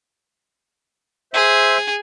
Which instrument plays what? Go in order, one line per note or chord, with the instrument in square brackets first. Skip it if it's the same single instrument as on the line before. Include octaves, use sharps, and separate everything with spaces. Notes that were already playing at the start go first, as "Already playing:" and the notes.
[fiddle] G#4 [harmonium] C5 E5